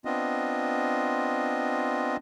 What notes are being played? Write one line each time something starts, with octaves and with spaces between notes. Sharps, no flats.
B3 C4 D4 F4 D#5